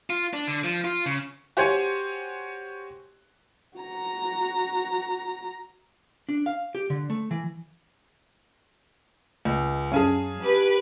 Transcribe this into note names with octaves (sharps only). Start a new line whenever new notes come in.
F4
D4
D3
F3
F4
C#3
F#4 G4 C5 C#5 G#5
F#4 A#5
D4
F5
G4
D3
A3
E3
C#2
F#2 C#4 G#4 F5 G#5 A5
G4 B4